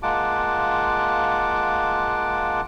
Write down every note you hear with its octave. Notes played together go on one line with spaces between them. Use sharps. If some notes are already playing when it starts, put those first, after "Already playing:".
G#3 A#3 F4 F#5 A5 D6